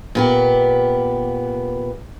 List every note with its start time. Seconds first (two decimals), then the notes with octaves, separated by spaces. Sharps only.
0.15 A#2 B3 G4